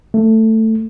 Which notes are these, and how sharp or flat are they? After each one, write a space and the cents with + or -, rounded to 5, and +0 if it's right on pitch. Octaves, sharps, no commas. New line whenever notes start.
A3 +10